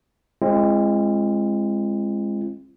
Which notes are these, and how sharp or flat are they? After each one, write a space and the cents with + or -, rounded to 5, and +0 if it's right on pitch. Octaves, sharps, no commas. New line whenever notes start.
G#3 +0 C4 +35 F4 -45